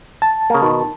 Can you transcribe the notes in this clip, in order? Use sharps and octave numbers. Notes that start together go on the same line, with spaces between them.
A5
C#3 A#3
B2 D#3